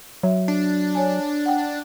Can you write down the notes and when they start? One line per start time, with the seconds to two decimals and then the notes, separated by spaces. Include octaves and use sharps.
0.23 F#3 E5
0.48 D4
0.95 C#5 G#5
1.46 F#5 G5